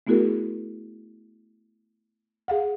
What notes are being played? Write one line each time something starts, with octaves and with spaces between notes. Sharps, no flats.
A3 B3 E4 F#4 G#4 A#4
G#4 F5 F#5